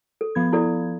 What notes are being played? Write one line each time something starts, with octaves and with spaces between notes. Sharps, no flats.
A4
F3 B3 G#6
E4 A4 D5